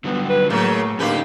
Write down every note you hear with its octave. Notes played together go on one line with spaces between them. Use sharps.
D3 F#3 G3 B3
B4
A2 C#3 F#3 A#3
D3 A#3 C#4 D#4 G4 B4 F5